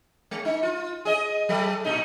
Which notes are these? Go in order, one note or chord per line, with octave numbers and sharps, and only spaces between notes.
G#3
D#4
F4
G#4 D#5
F#3 A4
A#2 D#4